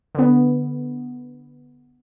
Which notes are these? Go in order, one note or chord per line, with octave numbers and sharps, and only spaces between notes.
D3 B3